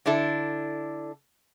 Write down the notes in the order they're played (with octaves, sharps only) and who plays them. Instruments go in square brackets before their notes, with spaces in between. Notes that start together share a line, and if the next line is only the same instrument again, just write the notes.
[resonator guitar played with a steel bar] D3 D4 E4 A4